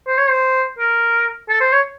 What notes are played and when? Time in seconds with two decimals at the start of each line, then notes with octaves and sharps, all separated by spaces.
0.07 C5
0.18 C#5
0.29 C5
0.78 A#4
1.49 A4
1.61 C5
1.72 C#5